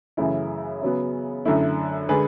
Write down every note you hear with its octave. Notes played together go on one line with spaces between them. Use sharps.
F#2 C#3 E3 A3 E4
C#3 F#3 B3
F#2 D3 A3 E4
D3 G#3 D4 G#4 B4